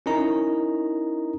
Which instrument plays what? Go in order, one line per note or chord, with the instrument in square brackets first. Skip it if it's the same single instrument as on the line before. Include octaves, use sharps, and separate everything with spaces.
[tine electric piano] C#4 D#4 E4 A#4 D#5 A#5